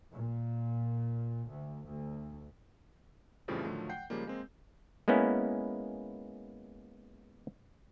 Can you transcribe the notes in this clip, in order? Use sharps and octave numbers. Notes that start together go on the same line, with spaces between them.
A#2
D2
D2
F2 A2 C#3 E3 F3 G3
A2 D3 D#3 F3 F#3 A3
F#5 G5 G6 C7
C#3 F3 G3 G#3 A#3
G#3 A#3 C4
G#3 A#3 B3 C#4 E4